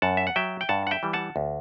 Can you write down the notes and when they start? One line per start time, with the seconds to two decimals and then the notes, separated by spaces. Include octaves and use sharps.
0.02 F#2 F#5 A5
0.17 E5
0.27 F#5
0.36 F#3 E5 G5
0.61 G5
0.69 G2 F#5 A5
0.87 F#5
0.91 E5 G5
1.03 E3 G3
1.13 F#5 A5
1.36 D2